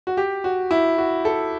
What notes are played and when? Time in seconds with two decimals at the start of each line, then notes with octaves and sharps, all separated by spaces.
0.07 F#4
0.17 G4
0.44 F#4
0.71 E4
0.98 F#4
1.25 A4